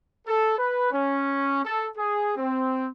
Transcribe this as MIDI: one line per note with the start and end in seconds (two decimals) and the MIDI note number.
0.27 0.58 69
0.58 0.90 71
0.91 1.63 61
1.65 1.87 69
1.96 2.32 68
2.36 2.88 60